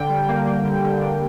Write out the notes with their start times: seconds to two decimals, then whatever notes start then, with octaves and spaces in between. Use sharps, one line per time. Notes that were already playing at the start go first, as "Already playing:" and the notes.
Already playing: D3 G5
0.09 G3
0.29 A#3
0.46 A#3
0.65 D3
0.84 D3
1.02 D3